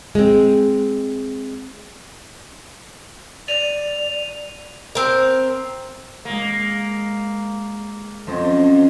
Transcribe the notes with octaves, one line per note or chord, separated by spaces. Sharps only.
G#3 C4
D5 D#7 F7
C4 A#4
G#3 A#3 D#7
F2 F#3 C4 C#4